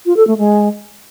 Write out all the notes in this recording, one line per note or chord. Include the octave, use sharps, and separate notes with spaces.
F4
A4
A3
G#3